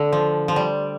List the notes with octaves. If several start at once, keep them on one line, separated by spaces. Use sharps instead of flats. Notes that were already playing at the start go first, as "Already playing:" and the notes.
Already playing: D3 A3
F3
F3
G3